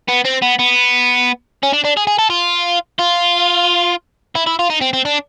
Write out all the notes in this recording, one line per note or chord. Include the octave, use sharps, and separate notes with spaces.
B3
C4
B3
B3
C#4
D4
D4
G#4
G#4
A4
F4
F4
E4
E4
F4
D#4
C4
C4
D4